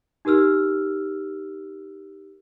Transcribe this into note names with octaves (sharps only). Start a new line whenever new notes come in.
D#4 G4 A#4 E6 F6